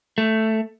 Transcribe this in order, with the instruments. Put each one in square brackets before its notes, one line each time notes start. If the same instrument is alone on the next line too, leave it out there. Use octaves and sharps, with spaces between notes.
[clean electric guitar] A3